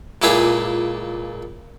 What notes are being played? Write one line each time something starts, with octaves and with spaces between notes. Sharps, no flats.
C#2 A#2 E4 G4 G#4 G#5